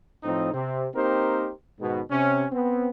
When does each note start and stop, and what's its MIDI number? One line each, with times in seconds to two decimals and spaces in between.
0.23 0.52 45
0.23 0.52 53
0.23 0.52 60
0.23 0.52 63
0.53 0.87 48
0.53 0.87 60
0.94 1.50 58
0.94 1.50 60
0.94 1.50 63
0.94 1.50 67
0.94 1.50 70
0.94 1.50 72
1.80 2.01 44
1.80 2.01 47
1.80 2.01 51
2.10 2.45 48
2.10 2.45 61
2.52 2.88 59
2.52 2.88 60